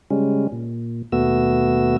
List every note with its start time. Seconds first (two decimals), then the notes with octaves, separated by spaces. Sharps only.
0.11 C#3 G3 G#3 C#4
0.52 A#2
1.12 D#2 B2 A3 B3 F#4 E6